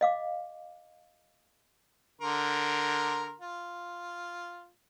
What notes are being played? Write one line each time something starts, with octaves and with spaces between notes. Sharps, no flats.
D#5 F5 D6
D3 A#4 C6
F4